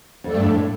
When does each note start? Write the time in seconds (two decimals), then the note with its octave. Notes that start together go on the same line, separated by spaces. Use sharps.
0.24 F2 A3 D4 A4
0.34 G2
0.44 F2
0.54 A2